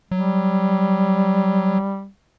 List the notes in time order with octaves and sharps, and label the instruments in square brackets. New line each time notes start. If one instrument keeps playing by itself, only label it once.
[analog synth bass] F#3 [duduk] G3